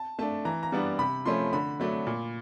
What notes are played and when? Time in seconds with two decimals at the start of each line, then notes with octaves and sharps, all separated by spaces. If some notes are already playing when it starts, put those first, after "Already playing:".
Already playing: A5
0.19 A3 D4 A5
0.45 E3 A#5
0.63 A#5
0.72 G3 B3 D4
0.99 C3 B5
1.26 F3 A3 C#4 C6
1.53 D3 B5
1.80 F#3 A3 D4
2.07 A#2